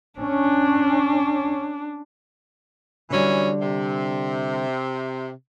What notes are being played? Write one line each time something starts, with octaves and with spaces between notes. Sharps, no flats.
C#4 D4
D3 E3 F#3 G3 C#4
C3